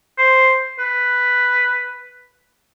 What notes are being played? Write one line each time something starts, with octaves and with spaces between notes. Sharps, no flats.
C5
B4